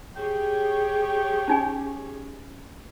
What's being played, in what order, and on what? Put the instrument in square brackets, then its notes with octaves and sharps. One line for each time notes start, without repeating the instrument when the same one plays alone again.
[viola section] G4 G#4 C#5 [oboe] G5
[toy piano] C#4 D#4 G#5